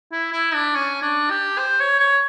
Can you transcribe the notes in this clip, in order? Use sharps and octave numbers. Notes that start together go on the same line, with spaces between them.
E4
E4
D4
C#4
D4
G4
C5
C#5
C#5